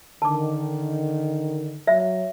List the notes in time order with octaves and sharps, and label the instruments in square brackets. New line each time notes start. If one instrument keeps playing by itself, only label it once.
[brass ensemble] D3 D#3 [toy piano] A5 D6
[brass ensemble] F#3 [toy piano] E5